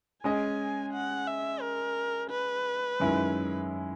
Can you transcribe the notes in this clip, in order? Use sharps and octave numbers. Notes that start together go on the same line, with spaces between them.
G#3 C#4 G#4 D#5 G#5
F#5
E5
A#4
B4
F#2 D#3 G#3 C#4 E4